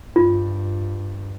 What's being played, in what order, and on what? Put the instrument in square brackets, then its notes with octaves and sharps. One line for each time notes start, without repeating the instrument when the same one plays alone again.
[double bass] G2 [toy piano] F4